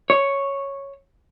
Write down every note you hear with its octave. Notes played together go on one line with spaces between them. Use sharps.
C#5